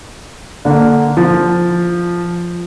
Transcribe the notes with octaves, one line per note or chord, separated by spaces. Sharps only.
D3 A#3
F3